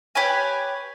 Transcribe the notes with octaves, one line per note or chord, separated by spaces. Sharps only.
G4 B4 C#5 G#5